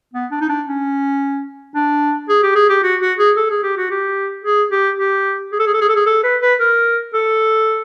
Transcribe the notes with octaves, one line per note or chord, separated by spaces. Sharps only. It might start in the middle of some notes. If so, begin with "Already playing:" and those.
B3
D4
D#4
D4
C#4
D4
G#4
G4
G#4
G4
F#4
F#4
G#4
A4
G#4
G4
F#4
G4
G#4
G4
G4
G#4
A4
G#4
A4
G#4
A4
G#4
A4
B4
B4
A#4
A4